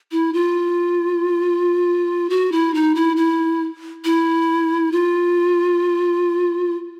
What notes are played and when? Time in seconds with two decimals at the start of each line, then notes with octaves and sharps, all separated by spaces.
0.12 E4
0.33 F4
2.30 F#4
2.52 E4
2.74 D#4
2.95 E4
3.17 E4
4.05 E4
4.92 F4